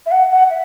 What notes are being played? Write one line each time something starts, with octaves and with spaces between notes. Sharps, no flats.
E5
F#5
F#5
E5